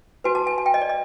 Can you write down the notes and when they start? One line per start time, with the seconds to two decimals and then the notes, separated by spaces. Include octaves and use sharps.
0.24 F#4 B4 G#5
0.35 A5
0.47 G#5
0.58 G#5
0.66 G5
0.74 D#5
0.82 D5
0.89 D#5